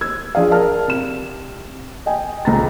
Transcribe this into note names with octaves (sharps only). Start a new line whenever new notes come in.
E6 G#6
F3 D4 G#4 D5 F5
A#4 F5 A5 F6
C3 E7
D#5 G5 G#5
D#1 C#2 A#5 A6